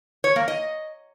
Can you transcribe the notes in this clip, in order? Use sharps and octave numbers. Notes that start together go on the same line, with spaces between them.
C#5
A#3
D#5